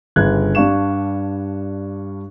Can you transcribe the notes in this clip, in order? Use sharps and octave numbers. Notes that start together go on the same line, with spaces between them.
G1 C#3 F#6 G#6
G2 G3 D4 F5 C#6 E7